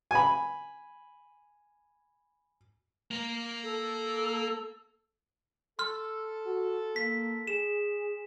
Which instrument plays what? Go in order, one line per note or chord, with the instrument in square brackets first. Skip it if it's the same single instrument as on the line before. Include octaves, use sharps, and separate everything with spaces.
[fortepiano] G#5 B5
[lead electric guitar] A#3 A#4
[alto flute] A4
[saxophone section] A4 [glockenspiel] C6 F6
[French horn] F#4
[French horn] A#3 [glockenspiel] B6
[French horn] G#4 [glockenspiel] E7